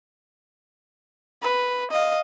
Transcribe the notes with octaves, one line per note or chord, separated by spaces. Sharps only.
B4
D#5 F5